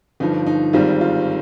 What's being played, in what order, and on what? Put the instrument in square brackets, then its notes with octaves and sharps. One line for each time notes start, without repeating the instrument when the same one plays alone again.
[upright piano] G1 G2 F3 D#4
D#4
G#1 G#2 D#3 G3 C4 F4
F4